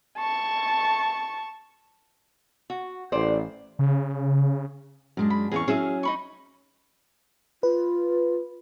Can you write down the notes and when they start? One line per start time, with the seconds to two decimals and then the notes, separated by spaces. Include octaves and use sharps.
0.18 A5 C#6
2.70 F#4
3.12 A1 C5 D5
3.79 C#3
5.17 F#2 G#3 D4
5.30 B5
5.52 E2 C#4 G#4 F5 C#6
5.68 F#3 C#4 G#4 E5 F5
6.03 D#4 B5 C#6
7.63 F4 B4